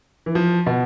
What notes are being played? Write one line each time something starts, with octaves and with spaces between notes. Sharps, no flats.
E3
F3
B2